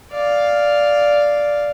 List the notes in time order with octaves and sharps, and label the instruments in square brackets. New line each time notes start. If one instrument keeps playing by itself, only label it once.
[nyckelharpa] D5 F5